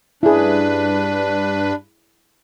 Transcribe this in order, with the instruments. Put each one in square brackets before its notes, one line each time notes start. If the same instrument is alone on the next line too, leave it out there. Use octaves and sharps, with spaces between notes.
[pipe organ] G2 B4 [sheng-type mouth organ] D4 [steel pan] E4 G#4